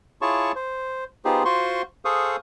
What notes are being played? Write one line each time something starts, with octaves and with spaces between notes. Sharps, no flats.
E4 F4 G#4 C#5 A5 C#6
C5
B3 D#4 F4 G4 G#4 C5
F4 F#4 C5 C6 C#6
G#4 A4 C5 F5 C#6 D#6